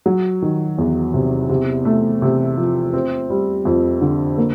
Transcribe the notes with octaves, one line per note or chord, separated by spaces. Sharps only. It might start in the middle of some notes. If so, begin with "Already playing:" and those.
F#3
D#3
E2
C3
C3
A3
C3
F3
C4
G3
F2
D3
A#3